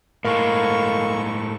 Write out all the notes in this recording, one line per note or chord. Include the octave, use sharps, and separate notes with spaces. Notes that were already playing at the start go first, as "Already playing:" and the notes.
A2 G#3 A#3 A4 C#6